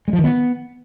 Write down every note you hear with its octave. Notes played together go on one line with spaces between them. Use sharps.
G#3
F3
D#3
B3